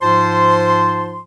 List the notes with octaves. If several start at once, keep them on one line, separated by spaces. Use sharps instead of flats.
G#2 F3 F4 C5 A5 C6